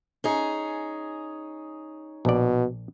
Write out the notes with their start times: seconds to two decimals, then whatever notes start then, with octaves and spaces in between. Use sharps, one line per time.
0.24 C#4 D#4 G#4
2.25 A#1 B2 D5